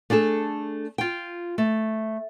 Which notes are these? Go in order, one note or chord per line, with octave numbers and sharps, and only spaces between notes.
A3 D4 G#4 A4
F4 G5
A3